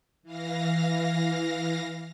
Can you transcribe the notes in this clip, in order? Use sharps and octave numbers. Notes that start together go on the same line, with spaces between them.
E3 F5 A#6